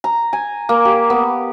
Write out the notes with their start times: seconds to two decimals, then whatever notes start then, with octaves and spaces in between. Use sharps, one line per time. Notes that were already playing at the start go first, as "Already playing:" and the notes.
0.04 A#5
0.33 G#5
0.69 A#3
0.85 G4
1.10 B3